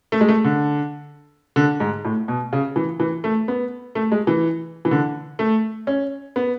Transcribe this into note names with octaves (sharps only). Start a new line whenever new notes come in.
A3
G#3
A3
D3
D3
G#2
A2
B2
C#3
E3
E3
A3
B3
A3
G#3
E3
E3
D3
A3
C#4
B3